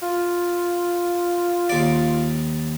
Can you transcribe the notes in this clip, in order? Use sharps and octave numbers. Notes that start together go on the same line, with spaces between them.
F4
D#2 D5